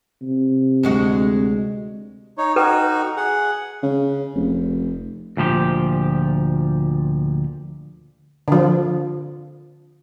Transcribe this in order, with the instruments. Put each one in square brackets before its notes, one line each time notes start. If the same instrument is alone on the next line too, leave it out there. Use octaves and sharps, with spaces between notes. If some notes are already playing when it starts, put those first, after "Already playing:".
[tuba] C3
[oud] D2 G#3 F#4
[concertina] D#4 C#5
[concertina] D#4 F#4 [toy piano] A4 B4 G5
[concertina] G#4 F#5
[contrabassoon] C#3
F1
[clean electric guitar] D2 A#2 F3 G4
[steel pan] D3 F3